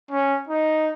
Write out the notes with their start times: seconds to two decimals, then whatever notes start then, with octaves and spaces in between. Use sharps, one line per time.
0.11 C#4
0.49 D#4